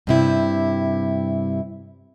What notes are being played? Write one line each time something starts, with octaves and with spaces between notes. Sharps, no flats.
G2 C3 E4